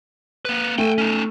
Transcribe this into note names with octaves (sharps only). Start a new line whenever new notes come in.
A#3 B4
A3 G5 G#5
C#4 D#4